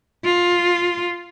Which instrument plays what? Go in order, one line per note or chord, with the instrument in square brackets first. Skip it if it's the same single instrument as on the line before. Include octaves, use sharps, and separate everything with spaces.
[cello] F4